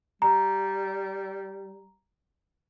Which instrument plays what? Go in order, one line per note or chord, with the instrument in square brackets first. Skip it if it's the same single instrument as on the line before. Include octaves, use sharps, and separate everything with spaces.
[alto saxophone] G3 [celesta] A#5